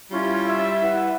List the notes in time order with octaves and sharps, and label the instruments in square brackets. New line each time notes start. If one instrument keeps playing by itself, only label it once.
[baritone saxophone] G3 [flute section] C#4 E4 F4
[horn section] E5
[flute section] E4 B4 F#5